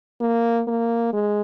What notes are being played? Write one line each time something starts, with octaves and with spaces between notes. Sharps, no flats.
A#3
A#3
G#3